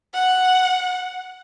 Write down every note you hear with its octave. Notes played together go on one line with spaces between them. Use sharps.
F#5